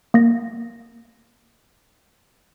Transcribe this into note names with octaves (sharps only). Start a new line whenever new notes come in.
A#3 A#6